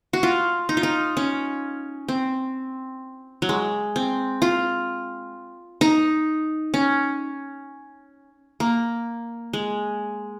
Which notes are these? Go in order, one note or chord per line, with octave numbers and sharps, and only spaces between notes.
F#4
F4
D#4
F4
D#4
C#4
C4
F#3
G#3
C4
F4
D#4
C#4
A#3
G#3